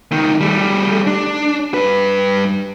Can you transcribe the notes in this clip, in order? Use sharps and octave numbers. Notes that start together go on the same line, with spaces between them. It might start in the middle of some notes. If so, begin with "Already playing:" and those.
C#2 D#3
G3 A3
D4
G2 B4